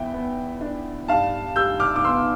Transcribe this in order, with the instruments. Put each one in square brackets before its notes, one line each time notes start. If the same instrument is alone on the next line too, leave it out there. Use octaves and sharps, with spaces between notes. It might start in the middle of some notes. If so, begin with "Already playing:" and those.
Already playing: [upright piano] E2 B3 E5 G5
B3
D4
G2 F5 A5
G3 E6 G6
D6 F6
D6
B3 C6 E6